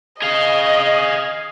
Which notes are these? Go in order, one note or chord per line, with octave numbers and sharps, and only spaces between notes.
G#4 D#5 F5